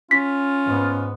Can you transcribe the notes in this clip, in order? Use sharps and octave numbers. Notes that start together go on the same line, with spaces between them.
C#4 F4 B6
G#2 B3